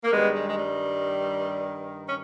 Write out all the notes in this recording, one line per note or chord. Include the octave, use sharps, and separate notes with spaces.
A#3
G2 D#3 G3 G#3 B3
G#3
G#3
G3
C#4